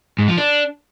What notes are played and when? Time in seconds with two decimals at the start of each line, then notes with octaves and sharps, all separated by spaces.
0.19 G#2
0.28 F3
0.38 D4